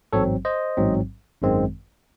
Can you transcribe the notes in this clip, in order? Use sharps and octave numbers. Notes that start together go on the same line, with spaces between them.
A1 G#2 F#3 C4 A4 C#5
C5 D#5
A1 G#2 F#3 C4
G#1 F#2 D#3 G#3 C4